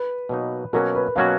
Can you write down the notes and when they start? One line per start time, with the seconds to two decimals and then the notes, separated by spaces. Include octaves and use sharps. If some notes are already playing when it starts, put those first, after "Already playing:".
Already playing: B4
0.29 B2 F#3 A#3 D#4
0.73 B2 F#3 A#3 C#4 F#4 A#4
0.95 B4
1.16 B2 F#3 A#3 C#4 F#4 F5